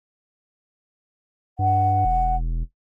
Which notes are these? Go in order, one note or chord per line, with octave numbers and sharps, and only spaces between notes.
G2 F#5
E1